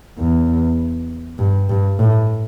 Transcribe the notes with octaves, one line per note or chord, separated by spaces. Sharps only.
E2
G2
G2
A2